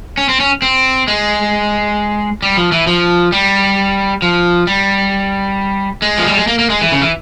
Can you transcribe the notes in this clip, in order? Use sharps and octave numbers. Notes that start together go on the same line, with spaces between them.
C#4
C4
C#4
C4
G#3
G3
F3
E3
F3
G3
F3
G3
G#3
F3
G3
G#3
A#3
A#3
G#3
E3
C#3
E3